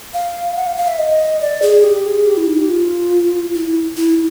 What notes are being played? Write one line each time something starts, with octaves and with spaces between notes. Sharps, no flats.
F5
F#5
F5
F5
E5
D#5
D5
G#4
G4
G#4
G4
E4
D#4
G4
F4
E4
E4